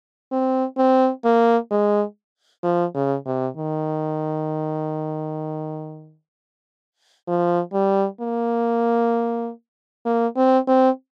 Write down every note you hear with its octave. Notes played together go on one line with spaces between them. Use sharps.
C4
C4
A#3
G#3
F3
C#3
C3
D#3
F3
G3
A#3
A#3
C4
C4